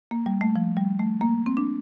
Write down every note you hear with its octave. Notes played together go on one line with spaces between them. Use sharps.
A#3
G3
A3
F3
G3
A3
A#3
C4
D4